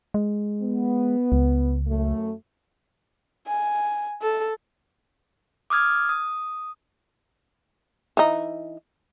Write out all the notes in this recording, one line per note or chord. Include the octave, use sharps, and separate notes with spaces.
G#3
B3
C#2
F#2 A3
G#5
A4
D6 D#6 F6 G#6
D#6
E3 D#4